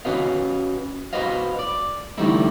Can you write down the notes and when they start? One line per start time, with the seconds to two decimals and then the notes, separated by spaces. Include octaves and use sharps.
0.05 C#4 F#4 B4 D#5 F5
1.13 F#4 B4 C5 D#5 F5
1.59 D5
2.18 D3 E3 G3 A3 D#4 E4